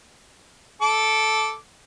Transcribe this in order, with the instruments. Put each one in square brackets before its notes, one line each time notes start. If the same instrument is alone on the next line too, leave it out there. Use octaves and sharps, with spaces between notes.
[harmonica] A4 D6